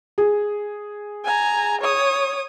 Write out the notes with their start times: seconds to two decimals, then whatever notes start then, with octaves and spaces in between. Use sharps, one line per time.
0.18 G#4
1.24 G#5 A#5
1.81 C#5 D#6